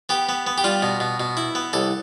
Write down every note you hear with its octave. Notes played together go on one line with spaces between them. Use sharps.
B3 G4
B3
B3
G4
G3 F4
B2
B2
B2
E4
B3
C2 A4